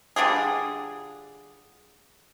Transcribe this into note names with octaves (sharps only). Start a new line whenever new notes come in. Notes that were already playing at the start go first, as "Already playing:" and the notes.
D3 G3 F4 G#4